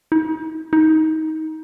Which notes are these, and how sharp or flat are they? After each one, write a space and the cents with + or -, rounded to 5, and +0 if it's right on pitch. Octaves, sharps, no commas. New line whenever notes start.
D#4 +40
D#4 +20